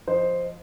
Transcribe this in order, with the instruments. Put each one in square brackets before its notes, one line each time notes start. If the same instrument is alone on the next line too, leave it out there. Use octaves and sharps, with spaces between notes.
[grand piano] F3 C5 D#5